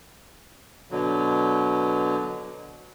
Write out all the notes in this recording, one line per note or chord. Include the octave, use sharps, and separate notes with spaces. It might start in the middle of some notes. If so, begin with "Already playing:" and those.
B2 D3 F#3